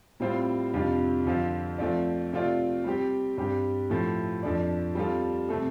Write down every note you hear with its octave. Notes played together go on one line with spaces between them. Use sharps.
A2 G3 C4 F4 C5
F2 C3 G3 D4 F4
F2 D3 F3 C4 F4
F3 A3 C4 F4 D5
C3 A3 C4 F4 D5
G3 C4 G4
G2 G3 C4 G4
A2 F3 A3
F2 F3 D4 A4 D5
G3 C4 F4 A4
C3 A3 C4 A4